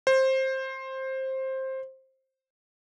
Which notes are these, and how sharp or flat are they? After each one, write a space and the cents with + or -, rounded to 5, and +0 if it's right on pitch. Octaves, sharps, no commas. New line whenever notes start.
C5 +15